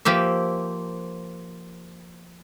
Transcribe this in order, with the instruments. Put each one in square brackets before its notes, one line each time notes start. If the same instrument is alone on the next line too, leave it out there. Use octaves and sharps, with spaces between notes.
[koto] F3 A#3 G4 E5